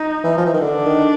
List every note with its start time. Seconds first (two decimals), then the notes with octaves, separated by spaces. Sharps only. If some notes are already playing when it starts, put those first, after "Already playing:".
Already playing: D#4
0.24 E3
0.38 F3
0.46 E3
0.53 D#3
0.61 D3 D4
0.86 D#3